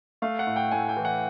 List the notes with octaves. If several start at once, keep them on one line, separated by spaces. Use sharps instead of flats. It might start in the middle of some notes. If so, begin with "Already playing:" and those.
A3 F5
F#5
A2
G5
A2 G#5
G5
E3
F#5